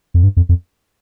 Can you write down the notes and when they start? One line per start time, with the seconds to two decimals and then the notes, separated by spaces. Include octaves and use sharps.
0.14 F2
0.23 G2
0.37 F2
0.49 F2